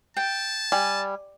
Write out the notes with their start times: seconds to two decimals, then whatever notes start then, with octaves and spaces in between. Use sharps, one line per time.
0.17 G5 A5
0.72 G3 G#5